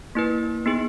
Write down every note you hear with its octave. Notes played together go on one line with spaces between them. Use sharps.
A#3 E4 B4
B3 D#4 G#4